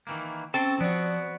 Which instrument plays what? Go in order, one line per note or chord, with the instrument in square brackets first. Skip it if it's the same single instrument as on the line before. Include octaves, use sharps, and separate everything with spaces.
[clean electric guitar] D#3 E3 A#3
[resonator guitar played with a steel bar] C4 [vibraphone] C#4 G5 C#6 [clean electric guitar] A4 A5
[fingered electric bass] F3 [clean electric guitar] B3 F#4 [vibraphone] D5